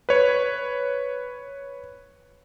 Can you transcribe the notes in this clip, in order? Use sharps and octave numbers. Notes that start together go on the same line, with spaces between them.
B4 C#5